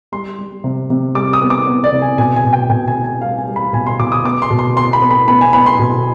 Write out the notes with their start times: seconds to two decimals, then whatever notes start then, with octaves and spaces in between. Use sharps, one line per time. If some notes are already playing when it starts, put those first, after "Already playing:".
0.12 G3 C6
0.39 G3
0.64 C3
0.90 C3
1.15 G3 D6
1.33 D#6
1.42 B3
1.50 D6
1.68 B3
1.84 D5
1.92 C3
2.02 G#5
2.18 B2 G#5
2.36 G#5
2.44 B2
2.53 G5
2.70 B2 G5
2.88 G#5
2.96 B3
3.04 G#5
3.21 G3 F5
3.38 G#5
3.47 G3
3.56 B5
3.73 B2 G#5
3.87 C6
3.99 B2 D6
4.12 D#6
4.24 B3 D6
4.42 C6
4.50 B2
4.59 C6
4.76 B3 C6
4.93 B5
5.02 B3
5.11 B5
5.28 B3 B5
5.41 G#5
5.53 B3 B5
5.66 C6
5.79 B2